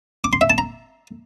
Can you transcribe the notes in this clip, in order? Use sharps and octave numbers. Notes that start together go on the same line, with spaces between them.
D6
C6
E5
A5
A#5